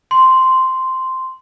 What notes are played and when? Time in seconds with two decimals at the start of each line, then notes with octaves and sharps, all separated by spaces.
0.11 C6